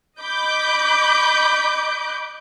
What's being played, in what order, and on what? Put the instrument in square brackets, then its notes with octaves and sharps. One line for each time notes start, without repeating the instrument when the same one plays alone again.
[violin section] D#5 B5 D6 G6